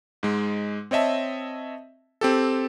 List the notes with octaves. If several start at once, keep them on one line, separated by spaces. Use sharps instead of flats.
G#2 G#3
C4 C#5 D#5 E5 A5
C4 G4 A4